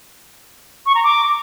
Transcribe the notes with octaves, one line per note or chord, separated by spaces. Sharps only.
C#6
A#5
D6